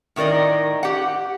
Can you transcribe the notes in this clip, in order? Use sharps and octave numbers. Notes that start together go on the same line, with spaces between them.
A2 D#3 A#4 D5 D#5
G4 F#5